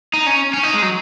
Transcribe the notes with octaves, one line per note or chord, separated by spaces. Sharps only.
D#4
C#4
C#4
D#4
G#3
F#3